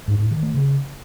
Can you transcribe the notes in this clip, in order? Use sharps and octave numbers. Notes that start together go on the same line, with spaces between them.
G#2
A2
D#3
A3
C#3